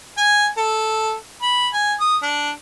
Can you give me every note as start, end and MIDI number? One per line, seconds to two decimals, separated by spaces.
0.17 0.47 80
0.57 1.14 69
1.42 1.68 83
1.73 1.94 80
2.00 2.17 87
2.22 2.51 62